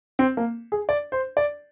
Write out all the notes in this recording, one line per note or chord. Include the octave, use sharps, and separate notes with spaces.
C4
A#3
G#4
D5
C5
D5